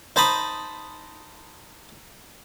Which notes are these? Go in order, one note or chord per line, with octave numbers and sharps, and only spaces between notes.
D#4 C5 A5 B5 D#6